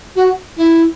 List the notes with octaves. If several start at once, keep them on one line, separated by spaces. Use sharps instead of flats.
F#4
E4